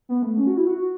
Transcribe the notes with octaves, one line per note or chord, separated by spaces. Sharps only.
B3
A3
C#4
F#4
E4
F#4